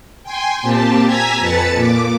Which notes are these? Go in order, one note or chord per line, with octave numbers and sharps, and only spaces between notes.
G5 G#5 C6
A#2 C4 G4 A5
G#5 A#5 E6 G#6 B6
F2 B4 A5 A6 C#7
A#2 D6